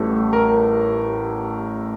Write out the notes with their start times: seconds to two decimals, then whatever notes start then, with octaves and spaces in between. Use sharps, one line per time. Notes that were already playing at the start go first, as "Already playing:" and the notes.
Already playing: A1 A2 E3 G3 A4
0.33 A#4